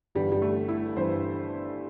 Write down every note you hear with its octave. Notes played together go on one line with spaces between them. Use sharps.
G1 G2 E3 G3
G3
A3
E4
G1 G2 E3 C5